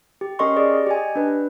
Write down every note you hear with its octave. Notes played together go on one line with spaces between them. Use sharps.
G4
C#4 G4 A#4 D#5 C6 C#6
G#4 D5
G4 D#5 G#5
D4 B4